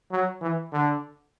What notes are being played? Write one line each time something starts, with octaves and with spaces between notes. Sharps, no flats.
F#3
E3
D3